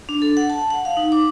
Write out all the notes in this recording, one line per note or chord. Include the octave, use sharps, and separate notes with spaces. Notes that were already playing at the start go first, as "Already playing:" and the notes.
D4
A4
F#5
A5
F#5
F5
D#4
D6